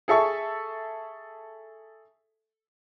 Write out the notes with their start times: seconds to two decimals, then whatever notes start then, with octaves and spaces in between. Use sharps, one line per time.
0.08 G#4 A4 E5 C#6